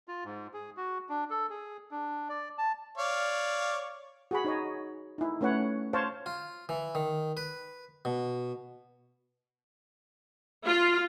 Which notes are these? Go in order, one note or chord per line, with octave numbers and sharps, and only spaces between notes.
F4
G#2
G#4
F#4
D4
A4
G#4
D4
D5
A5
C#5 D5 F5
F#4 G#4 B5
D#4 C#5 D#5
D#4 E4
A3 C#4 B4 C#5 F#5
C5 C#5 F5 A5
F4
E3
D#3
B4
B2
F4